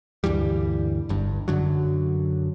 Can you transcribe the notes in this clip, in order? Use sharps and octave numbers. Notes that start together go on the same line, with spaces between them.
D2 G2 E3 G3
G1 G2
F#2 D3 F#3